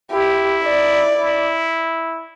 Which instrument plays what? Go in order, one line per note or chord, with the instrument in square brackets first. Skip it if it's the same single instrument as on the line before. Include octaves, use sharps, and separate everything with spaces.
[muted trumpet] E4 [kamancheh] G4
[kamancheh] D5
[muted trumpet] E4